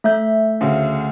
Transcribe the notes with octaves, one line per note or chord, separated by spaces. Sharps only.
A3 E5 G6
D2 C#3